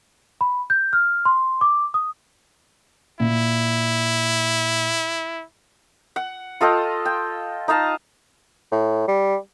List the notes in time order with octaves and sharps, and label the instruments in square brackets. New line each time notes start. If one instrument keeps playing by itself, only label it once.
[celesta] B5
G6
F6
C6
D6
D#6
[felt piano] A#2 [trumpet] E4
[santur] F#5
F4 A4 D#5 G5
G5
D#4 D#5 F5 A5
[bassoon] A2
G3